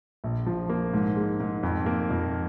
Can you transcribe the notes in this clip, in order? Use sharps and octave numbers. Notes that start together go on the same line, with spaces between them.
A#1
F3
A#3
G#2
G#3
G#2
F2
A#3
F2